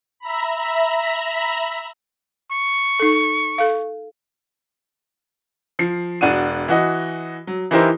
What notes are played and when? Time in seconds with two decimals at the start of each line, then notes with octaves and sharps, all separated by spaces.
0.19 E5 A#5 B5
2.52 C#6
3.00 D#4 A4
3.58 A4 F5
5.79 F3 C7
6.21 E1 D4 F#4 D#7
6.68 E3 F#4 D#5
7.47 F#3
7.71 E3 D#4 E4 G4 A#4 C5